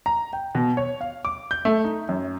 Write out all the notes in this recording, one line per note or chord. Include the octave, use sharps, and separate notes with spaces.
A#5
G5
B2
C#5
F5
D6
G6
A3
D#4
F#2